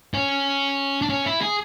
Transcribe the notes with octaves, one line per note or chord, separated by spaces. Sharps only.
C#4
D4
C#4
E4
G#4